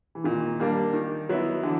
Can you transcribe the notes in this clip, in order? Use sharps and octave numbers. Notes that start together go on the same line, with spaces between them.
E3
A#2 D#3
G3 A#3 D4
D#3
F#3 B3 E4
D3 E3